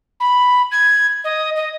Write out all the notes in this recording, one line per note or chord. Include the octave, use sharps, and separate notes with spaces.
B5
G#6
D#5
D#5